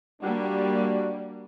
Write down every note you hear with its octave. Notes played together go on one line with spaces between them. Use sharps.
G3 A#3 D4 F#4